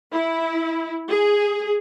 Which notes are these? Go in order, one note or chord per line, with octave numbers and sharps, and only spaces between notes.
E4
G#4